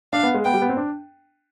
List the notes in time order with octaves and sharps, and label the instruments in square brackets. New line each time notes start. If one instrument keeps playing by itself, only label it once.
[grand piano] D4 [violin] F5
[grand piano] B3
G#3
[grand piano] B3 [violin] G5
[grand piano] G3
B3
C4
D4